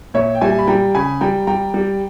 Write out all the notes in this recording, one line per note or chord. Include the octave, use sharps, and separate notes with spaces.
A#2 C#5 E5
G5
G3 E5 G#5
B5
G3 G5 A#5
C#3 G#5 B5
G3 G5 A#5
G3 G5 A#5
G3